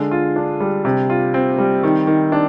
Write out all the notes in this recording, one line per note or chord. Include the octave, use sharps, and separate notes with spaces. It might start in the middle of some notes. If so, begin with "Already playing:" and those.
Already playing: D3 G#3
F4
D4
G3
C3
F4
C4
G3
D#3
D#3
D4